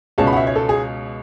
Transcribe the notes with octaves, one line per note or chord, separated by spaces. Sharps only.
C#2 B2 G#3 C#4 A5
B5
F#5
E5
C#5
A4
G#4